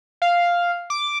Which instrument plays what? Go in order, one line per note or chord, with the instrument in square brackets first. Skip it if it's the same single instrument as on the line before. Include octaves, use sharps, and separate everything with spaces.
[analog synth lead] F5
D6